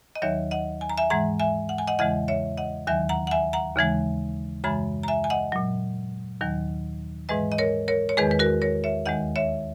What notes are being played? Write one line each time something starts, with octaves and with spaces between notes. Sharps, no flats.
D#5
D#2 D#3 F#3 C#5 E5
D#5 F#5
G#5
A#5
E5 G#5
G#2 E3 G#3 F#5 A#5
E5 G#5
F#5
G#5
D#5 F#5
E2 C#3 E3 G#3 D#5 F#5
C#5 E5
D#5 F#5
D#2 D#3 F#3 E5 G#5
F#5 A#5
F#5
E5 G#5
F#5 A#5
D#2 C#3 E3 G#3
F#2 C#3 E3 G#3 G#5 B5
A#5
E5 G#5
G#5
D#5 F#5
A#2 F#3
D#2 D#3 F#3
G#2 E3 G#3 B4 D#5
D#5
A#4 C#5
A#4 C#5
C#5
E2 D#3 G#3 G#4 B4
B4
F#4 A#4
A#4 C#5
C#5 E5
D#2 D#3 G#3 D#5 F#5
C#5 E5